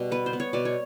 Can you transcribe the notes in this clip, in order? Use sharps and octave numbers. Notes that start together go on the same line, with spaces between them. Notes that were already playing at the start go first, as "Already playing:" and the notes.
Already playing: B2 G3
B3 B4
C5
B3
C#5
B2 D5
C#5